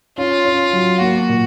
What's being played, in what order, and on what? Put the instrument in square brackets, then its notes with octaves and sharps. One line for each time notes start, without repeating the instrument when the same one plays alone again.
[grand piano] C#4 [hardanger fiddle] F4
[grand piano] C#4
F#3
[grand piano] A#3 [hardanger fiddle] F#4
[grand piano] A#2